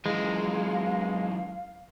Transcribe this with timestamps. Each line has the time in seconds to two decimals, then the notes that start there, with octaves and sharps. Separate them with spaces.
0.06 F#2 E3 G#3 F5